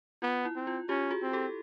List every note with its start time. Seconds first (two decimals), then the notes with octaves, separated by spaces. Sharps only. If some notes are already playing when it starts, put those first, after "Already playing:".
0.22 B3 F4
0.45 E4
0.56 C4
0.67 F4
0.89 C#4 F4 G4
1.11 F#4 G#4
1.22 C4
1.33 G4 A4